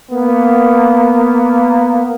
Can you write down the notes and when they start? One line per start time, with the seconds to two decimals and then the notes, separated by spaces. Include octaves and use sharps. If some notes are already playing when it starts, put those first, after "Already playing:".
0.11 A#3 B3